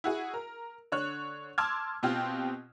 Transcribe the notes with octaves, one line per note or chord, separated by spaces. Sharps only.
E4 F#4 G#4
A#4
D3 C#5 F#6
A5 C6 D6 E6 F6 G#6
B2 C4 F4 G4